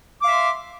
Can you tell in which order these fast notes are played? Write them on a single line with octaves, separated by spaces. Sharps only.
D6 F5 E5 C6